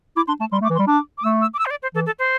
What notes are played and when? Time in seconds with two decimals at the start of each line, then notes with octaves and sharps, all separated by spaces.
0.16 E4 D6
0.28 D4 C6
0.40 A3 A5
0.52 G3 C6
0.61 A3
0.64 D6
0.70 E3
0.75 C6
0.79 G3
0.87 D4 D6
1.18 D6
1.24 A3 E6
1.41 E6
1.54 D6
1.59 E6
1.66 C5
1.71 D5
1.83 C5
1.95 E3 A4
2.06 A4
2.19 C5